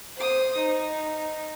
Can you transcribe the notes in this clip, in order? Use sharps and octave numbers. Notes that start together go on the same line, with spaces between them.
C5 D#6
D#4